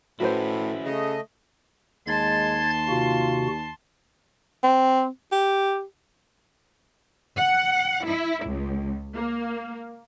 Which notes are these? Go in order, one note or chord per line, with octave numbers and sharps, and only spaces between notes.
A2 C#4 E4 F#4 B4 C5
C#3 A3 D#5
D#2 G#3 A5 C6 G#6 A6
C3 F4 F#4
C4
G4
F#5
E4
C#2
A#3